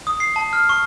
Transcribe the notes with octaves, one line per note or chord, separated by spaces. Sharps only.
D#6
C7
A5
F6
C#6